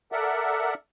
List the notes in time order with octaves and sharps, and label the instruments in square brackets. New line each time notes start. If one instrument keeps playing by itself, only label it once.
[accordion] A4 A#4 D5 E5 F#5